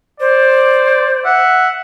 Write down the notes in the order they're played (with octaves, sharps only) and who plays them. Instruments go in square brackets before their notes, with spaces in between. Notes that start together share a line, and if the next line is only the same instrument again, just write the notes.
[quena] C5 [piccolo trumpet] D5
[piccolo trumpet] E5 [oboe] F#5